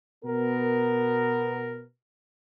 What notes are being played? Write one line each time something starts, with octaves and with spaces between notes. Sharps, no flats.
B2 B3 A#4